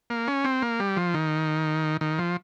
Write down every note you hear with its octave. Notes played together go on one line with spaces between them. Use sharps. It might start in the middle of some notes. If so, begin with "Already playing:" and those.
A#3
C#4
C4
A#3
G3
F3
D#3
D#3
F3